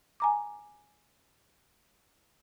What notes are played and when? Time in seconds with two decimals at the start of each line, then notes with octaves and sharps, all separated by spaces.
0.20 G#5 A#5 D6